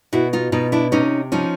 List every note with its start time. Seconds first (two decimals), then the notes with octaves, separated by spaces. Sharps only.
0.13 B2 E4 F#4
0.33 D#4 F4
0.52 B2 D#4 F4
0.72 D4 E4
0.92 C3 C#4 D#4
1.32 F3 C#4 D#4